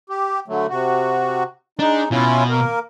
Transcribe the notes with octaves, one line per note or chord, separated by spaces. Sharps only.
G4
D3 F#3 A3
C3 F#4
G#3 D4 D#4
B2 C#4 E4 F4
A#3 A#4